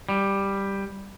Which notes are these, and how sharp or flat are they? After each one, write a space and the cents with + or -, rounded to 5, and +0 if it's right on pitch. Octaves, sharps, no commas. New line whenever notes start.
G3 +5